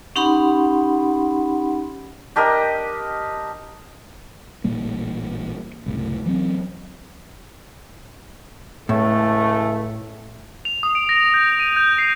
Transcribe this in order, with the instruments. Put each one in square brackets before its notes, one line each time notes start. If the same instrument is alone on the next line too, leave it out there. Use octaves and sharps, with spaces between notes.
[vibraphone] C#4 D#4 G4 F#5 B5 C6
[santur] D4 G4 A#4 D#5
[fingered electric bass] A1 A#2 G3 A#3
F#1 C2 A2
E3 F#3 C4
[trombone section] C#2 E3 A3 [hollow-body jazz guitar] A2
[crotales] F7
D#6
D7
A#6
G6
D#7
G6
C7